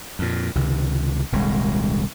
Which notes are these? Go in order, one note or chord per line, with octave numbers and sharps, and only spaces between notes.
F2 A#2
C#2 C3 D#3
D#1 C2 G#3